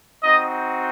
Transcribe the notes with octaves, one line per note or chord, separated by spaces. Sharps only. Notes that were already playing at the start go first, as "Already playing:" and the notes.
C4 D#4 F#4 D#5